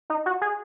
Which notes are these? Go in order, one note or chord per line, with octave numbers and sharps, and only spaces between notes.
D#4
F#4
G#4